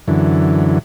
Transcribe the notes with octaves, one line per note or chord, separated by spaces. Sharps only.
F#2 D3 E3